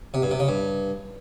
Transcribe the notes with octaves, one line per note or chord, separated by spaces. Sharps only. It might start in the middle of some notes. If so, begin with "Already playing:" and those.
C3
G2
C3
C#3
G2